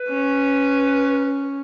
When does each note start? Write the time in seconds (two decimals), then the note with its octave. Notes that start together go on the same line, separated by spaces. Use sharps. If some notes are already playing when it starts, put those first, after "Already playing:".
Already playing: B4
0.09 C#4